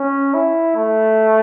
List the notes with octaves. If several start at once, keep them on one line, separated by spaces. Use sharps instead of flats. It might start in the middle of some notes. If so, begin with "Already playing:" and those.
Already playing: C#4
E4
A3